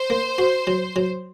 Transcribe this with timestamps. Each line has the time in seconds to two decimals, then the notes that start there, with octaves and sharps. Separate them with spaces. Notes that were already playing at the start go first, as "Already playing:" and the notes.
Already playing: C5
0.10 A#3
0.38 F#4
0.67 F#3
0.96 F#3